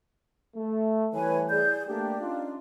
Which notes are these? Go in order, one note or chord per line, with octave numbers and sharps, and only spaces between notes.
A3
E3 G3 A3 B4 C#5 G#5
G#4 D5 G6
A3 A#3 D4 G4
C#4 D#4 F4